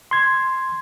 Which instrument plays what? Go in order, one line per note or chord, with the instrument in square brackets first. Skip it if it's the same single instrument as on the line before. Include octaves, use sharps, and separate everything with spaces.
[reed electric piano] C6 G#6